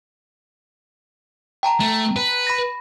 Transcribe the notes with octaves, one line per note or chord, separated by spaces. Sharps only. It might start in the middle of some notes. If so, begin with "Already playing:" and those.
G5 A5 A#5
A3
B4
B5 A#6